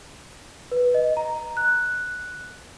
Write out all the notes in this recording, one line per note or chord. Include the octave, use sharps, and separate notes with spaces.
B4
D#5
A#5
F#6